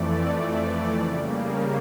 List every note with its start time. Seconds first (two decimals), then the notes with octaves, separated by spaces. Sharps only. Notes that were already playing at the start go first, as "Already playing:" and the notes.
Already playing: F2 E3 A3 D5
1.02 C#3 G3 A#3